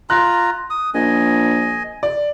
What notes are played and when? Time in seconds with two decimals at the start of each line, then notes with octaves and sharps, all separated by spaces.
0.10 F4 A#5 F#6
0.70 D#6
0.94 A#1 D#5 G#5
2.03 D5